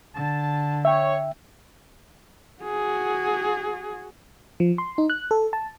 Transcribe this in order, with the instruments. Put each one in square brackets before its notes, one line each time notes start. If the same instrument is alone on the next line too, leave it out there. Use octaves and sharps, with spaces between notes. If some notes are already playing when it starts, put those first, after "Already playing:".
[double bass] D3 [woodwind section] A5
[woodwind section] C#5 [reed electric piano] E5 G5
[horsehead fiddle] F#4 G#4
[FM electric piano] F3
C6
D#4
F#6
A4
A5